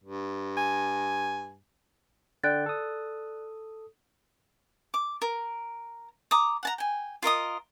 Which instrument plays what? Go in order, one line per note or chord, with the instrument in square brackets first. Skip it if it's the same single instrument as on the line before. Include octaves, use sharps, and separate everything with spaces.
[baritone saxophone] G2
[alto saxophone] G#5
[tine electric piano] D3 G5 [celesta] D5 F#6 A6
[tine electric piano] A4 D#6
[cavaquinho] D6
A#4
A#5 D6 D#6
F#5 A5 A#5
G5 G#5
F4 A#4 D#5 D#6